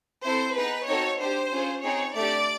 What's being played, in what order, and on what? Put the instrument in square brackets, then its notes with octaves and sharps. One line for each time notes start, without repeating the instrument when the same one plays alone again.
[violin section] C4 E4 A4 C5
B3 D#4 G#4 B4
C4 D#4 F#4 A4 C#5
D4 G4 C5
C#4 F4 G#4
C4 D#4 G#4 C#5
A3 D4 G4 D5